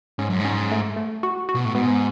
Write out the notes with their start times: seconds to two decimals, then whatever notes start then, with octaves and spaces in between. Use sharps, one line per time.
0.19 G#2 C#4
0.30 F#2
0.40 G#2
0.45 C#4
0.72 A3
0.96 A3
1.23 F#4
1.49 F#4
1.55 B2
1.65 A2
1.75 G#2 B3